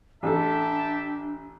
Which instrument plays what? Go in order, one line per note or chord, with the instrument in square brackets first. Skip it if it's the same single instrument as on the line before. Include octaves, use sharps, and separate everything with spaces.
[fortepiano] A1 A4 [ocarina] D4 [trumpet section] G4 E5 A5